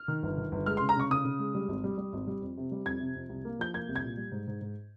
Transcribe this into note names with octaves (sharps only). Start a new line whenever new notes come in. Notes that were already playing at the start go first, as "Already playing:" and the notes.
Already playing: F6
D#3
G1
D#3
G1
G#3 F6
C6
C#3
A#5
C#3 C#6
C#3 D#6
C#3
G#3
G3
G#1
G3
G3
G#1
G3
F2
C3
G3
F2 G#6
C3
F2
C2
A#3
F3 G6
A#3 G#6
C2
G#6
A#2
G3
G#2
G#2
G#2